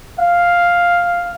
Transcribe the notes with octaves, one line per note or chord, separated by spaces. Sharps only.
F5